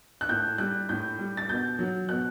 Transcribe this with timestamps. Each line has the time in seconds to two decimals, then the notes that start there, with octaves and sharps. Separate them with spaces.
0.21 F#6
0.29 A2 G6
0.58 G3 F#6
0.89 A2 G6
1.19 G3
1.37 A6
1.49 B2 G6
1.79 F#3
2.09 B2 F#6